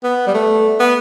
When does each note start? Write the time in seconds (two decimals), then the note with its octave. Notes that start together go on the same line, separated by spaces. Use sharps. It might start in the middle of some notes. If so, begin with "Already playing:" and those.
0.04 B3
0.27 G3
0.34 A3
0.80 B3